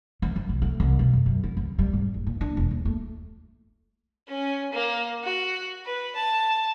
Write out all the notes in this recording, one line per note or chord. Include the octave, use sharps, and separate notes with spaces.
E3
F3
B1
A3
C2
B2
F#2
F#2
E4
C#2
G3
G#2
F#1
A#2
D4
E1
D#2
A3
C#4
A#3
F#4
B4
A5